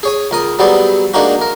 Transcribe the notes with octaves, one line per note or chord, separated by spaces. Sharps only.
G#4 C#5 G#5
C#2 A#4 D#6
F#3 G3 B3 C4 G#4 D5
G#3 A#3 D4 D#4 F#4
A#4